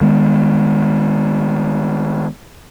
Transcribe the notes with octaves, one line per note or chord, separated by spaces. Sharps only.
D#3 G#3 B3